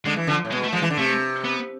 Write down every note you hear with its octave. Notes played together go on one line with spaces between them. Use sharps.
D3 G#3
E3
D3 F3
A2
B2 G#3
A3
F3 G#3
E3
D3
C3 A3
B3